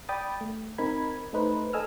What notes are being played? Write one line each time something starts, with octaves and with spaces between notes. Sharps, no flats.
D5 G5 B5 D#6 A6
A3
C4 D#4 A#4 B5 G#6
A3 D#4 B4 C5
A4 D#5 G#5 E6 F6